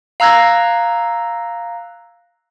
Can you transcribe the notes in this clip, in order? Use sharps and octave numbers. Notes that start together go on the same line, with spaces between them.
F5 A#5 E6 F#6 G#6 A#6